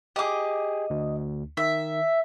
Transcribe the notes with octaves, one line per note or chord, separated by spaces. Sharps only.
G4 G#4 D#5 D6
D2
D#3 E5